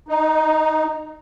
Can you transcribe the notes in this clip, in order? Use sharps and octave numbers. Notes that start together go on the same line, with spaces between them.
D#4